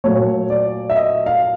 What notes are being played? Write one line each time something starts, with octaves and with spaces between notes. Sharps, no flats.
A#2 F#3 A3 C#5
D5
E5
D#5
F5